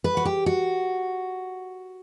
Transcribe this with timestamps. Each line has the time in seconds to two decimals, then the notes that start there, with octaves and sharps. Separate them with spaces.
0.04 B4
0.17 F#4
0.25 G4
0.46 F#4